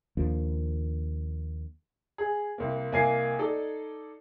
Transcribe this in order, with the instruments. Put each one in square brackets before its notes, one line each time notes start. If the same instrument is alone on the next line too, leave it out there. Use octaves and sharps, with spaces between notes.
[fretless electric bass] D#2 F3 A#3 D4
[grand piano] G#4
C2 A#3
C2 A#3 D#5 G#5 G#6 C7
D#4 A4 D5